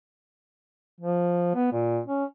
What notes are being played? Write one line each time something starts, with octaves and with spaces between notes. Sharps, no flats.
F3
B3
A#2
C#4